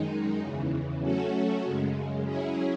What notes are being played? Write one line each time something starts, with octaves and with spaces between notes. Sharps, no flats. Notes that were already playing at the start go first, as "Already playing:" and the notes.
Already playing: F#2 D#3 G#3 D#4
E2 C#3 E3
F#3 A3 C#4 F#4 A4
F#2 C#3 G#3
F#3 C#4 E4 G#4